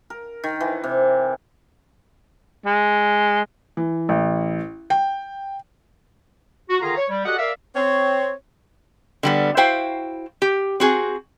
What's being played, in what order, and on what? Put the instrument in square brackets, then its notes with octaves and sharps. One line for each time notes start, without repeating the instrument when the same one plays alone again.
[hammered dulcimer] A#4
D#3
E3
C3
[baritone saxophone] G#3
[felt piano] E3
A1
G5
[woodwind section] F#4
D3 D#3 F4 G#4 F5 A#5
C#5
G3
F#4 G4 A4 D5 D#5 F#5
A#4 D5 E5 F5
[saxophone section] C4 C#5
[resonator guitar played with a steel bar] D3 G3 B3
E4 F#4 C5 F5 G5
G4
C4 F#4 G#4